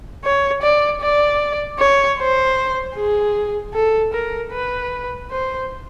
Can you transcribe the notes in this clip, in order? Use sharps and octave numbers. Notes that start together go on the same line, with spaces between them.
C#5
D5
D5
C#5
C5
G#4
A4
A#4
B4
C5